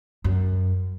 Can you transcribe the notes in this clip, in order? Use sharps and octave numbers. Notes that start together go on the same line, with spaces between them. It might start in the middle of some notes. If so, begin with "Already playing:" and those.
F#2